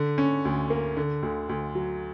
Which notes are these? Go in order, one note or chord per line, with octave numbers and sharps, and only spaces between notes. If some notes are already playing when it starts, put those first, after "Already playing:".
Already playing: D3
C#4
D2
A#3
D3
D2
D2
F#3